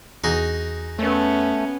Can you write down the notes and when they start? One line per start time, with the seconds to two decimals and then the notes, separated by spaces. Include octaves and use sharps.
0.24 E2 D#4 F#4 G#4
0.99 A3 B3 C#4